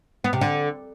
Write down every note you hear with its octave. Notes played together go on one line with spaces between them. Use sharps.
B3
C3
D3